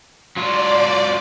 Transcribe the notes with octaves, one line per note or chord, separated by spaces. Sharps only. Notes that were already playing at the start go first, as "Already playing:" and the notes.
F#3 F4 D5